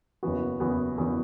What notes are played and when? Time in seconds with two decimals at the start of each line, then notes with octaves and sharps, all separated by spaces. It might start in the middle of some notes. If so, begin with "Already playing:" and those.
0.23 F#1 E2 E3 B3 F#4
0.60 F#1 E2 E3 B3 F#4
0.97 F#1 E2 E3 B3 F#4